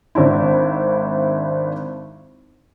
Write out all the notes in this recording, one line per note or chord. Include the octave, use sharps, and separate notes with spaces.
G#1 D4 E4